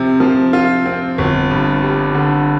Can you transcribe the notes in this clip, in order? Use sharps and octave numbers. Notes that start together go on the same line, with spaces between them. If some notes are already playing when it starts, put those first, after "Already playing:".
Already playing: C3 F3 C4
F3
F4
C4
G1
G2
G3
D3